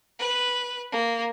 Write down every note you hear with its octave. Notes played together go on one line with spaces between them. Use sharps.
B4
A#3